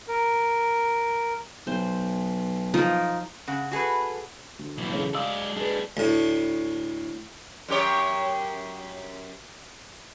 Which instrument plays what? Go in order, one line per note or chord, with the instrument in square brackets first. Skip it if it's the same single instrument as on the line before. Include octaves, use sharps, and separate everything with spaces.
[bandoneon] A#4
[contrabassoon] B1 [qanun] C5
[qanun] F3 D#4 A#4
[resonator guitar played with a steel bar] C#3 F#5
F#4 G#4 A4 B4
[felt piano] D2
[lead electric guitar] B1 E3
[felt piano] C#3 A3
[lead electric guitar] G#3 D5 [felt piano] F5 D#6 E6
[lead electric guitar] G#3 D4 [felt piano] G#4 B4
[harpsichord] D2 A2
[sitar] F#2 G4 C#5